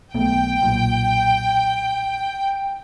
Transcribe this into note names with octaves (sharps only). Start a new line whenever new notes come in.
B1 A3 B3 G5
B1 A#2